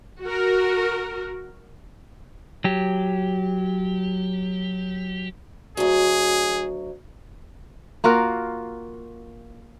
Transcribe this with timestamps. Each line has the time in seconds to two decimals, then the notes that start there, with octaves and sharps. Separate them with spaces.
0.22 F#4 A#4
2.64 F#3 G4
5.77 D2 F#3 G#4
8.04 A#3 F4 F#4 A#4